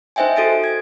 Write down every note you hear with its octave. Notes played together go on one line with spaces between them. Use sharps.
D#4 C5 D#5 E5 G5 G#5
F#4 A4 A6 D7
G#6